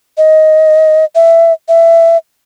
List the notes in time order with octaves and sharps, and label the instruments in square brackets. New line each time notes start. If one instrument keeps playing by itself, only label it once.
[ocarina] D#5
E5
E5